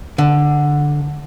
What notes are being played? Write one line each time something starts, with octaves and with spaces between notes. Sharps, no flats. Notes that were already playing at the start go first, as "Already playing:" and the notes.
D3